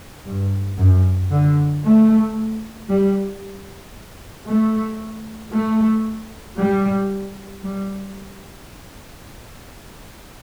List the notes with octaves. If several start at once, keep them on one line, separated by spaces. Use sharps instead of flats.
G2
F#2
D3
A3
G3
A3
A3
G3
G3